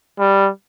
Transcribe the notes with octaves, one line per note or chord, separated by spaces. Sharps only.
G3